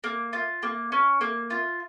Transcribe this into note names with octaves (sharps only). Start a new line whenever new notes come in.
A#3
F4
A#3
C#4
A#3
F4